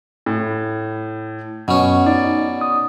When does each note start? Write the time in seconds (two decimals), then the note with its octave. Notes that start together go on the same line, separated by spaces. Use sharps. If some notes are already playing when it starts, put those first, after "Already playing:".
0.26 A2
1.68 F#2 B2 C#4
2.06 D#4 D5
2.61 D#6